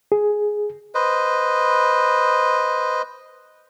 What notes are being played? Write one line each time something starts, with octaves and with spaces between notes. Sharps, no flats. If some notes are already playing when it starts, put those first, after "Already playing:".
G#4
B4 C5 D#5